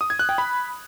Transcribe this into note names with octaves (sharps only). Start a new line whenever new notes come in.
D#6
G#6
F#6
G5
B5